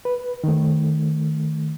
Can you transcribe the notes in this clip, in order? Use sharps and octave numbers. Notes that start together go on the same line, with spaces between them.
B4
D#3 A3